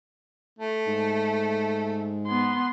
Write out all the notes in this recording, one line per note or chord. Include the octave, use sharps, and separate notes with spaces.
A3
G#2
B3 C6